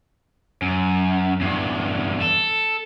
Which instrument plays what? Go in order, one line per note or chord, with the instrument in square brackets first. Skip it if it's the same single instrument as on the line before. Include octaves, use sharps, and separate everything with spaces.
[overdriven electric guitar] F#2
E2 G2
A4